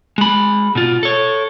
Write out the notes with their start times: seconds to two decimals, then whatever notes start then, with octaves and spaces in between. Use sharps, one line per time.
0.18 G#3 B5
0.75 B2 F4
1.03 A4 C#5